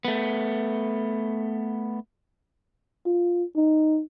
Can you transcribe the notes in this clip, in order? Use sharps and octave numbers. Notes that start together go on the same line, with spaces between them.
A3 B3
F4
D#4